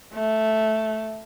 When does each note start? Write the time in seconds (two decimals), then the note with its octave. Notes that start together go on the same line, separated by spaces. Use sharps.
0.14 A3